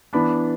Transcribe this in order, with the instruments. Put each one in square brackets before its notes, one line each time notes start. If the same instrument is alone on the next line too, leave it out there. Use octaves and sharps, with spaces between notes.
[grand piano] E3 B3 D4 B5